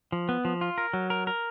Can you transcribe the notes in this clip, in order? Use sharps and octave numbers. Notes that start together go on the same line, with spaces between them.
F3
B3
F3
F4
A#4
F#3
A#4
A#4